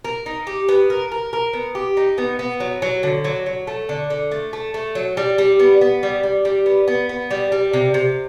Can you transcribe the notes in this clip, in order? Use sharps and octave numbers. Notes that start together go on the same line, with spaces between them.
A#4
D#4
G4
B3
A#4
A#4
A#4
B3
G4
D#4
B3
B3
F#3
F#3
D3
F#3
F#3
A3
D3
D3
A3
A3
A3
F#3
G3
G3
B3
B3
G3
G3
G3
B3
B3
B3
G3
G3
C3
C3